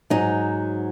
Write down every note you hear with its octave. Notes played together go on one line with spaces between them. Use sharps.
G#2 F#3 D#4